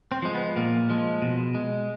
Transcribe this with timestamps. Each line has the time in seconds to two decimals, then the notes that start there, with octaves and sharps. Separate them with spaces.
0.12 C4
0.22 F3 G#3
0.34 B3
0.56 A#2 A#3
0.90 F3 G#3
1.22 B2
1.55 G#3